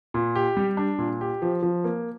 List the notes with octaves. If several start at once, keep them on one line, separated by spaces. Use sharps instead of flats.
A#2
G4
G3
D4
A#2
G4
F3
F3
A#3